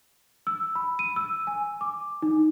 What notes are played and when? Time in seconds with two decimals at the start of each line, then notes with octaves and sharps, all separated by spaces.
0.47 E6
0.75 B5
0.99 D#7
1.16 E6
1.47 G#5
1.81 D6
2.22 D#4